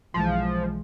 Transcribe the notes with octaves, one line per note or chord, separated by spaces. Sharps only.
B1 E3 F3 G#3